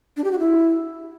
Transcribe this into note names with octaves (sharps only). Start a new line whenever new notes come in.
D4
G4
F#4
E4